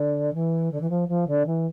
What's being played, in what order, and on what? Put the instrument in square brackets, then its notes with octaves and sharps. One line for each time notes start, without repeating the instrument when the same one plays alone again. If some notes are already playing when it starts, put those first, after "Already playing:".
Already playing: [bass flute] D3
E3
D3
E3
F3
F3
D3
E3